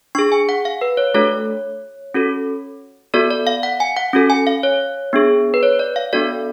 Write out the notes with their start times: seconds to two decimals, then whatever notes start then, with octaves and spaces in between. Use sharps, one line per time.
0.15 D4 G#4 C#6
0.32 G#5
0.49 F#5
0.65 F5
0.81 B4
0.97 C#5
1.14 A3 D4 F#4 A4 C#5
2.14 C#4 F#4 A4
3.14 B3 F#4 A4 D5
3.31 D5
3.47 F5
3.63 F#5
3.80 G#5
3.97 F#5
4.13 C#4 F#4 A4
4.30 G#5
4.47 F5
4.63 C#5
5.13 B3 D4 G#4
5.54 B4
5.63 C#5
5.79 D5
5.96 F5
6.13 B3 D4 F#4 A4 D5